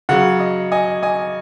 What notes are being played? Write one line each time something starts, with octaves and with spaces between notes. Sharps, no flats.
C#3 F#3 F#5
D#5
D#5 G#5
D#5 G#5